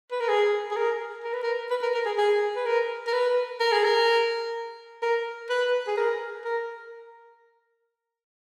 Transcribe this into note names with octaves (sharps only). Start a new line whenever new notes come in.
B4
A#4
G#4
G#4
A#4
A#4
B4
A#4
B4
A#4
A#4
G#4
G#4
B4
A#4
A#4
B4
A#4
G#4
A#4
A#4
B4
G#4
A#4
A#4